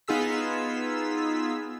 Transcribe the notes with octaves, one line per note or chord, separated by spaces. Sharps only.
B3 D#4 F4 G#4 E6 B6